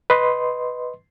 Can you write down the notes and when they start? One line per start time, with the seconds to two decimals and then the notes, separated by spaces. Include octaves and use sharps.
0.10 B4 D#5 C6